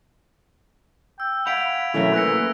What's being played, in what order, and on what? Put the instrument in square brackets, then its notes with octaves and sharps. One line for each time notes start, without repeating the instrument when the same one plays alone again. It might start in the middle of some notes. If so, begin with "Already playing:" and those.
[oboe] G5 [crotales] E6
[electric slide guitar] F5 F#5 [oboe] B5 [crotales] G#6 D7 F7
[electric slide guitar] B2 F#3 A#4 [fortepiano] E3 A3 C#4
[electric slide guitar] A#3 [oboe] B4 [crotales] E6 A#6 C#7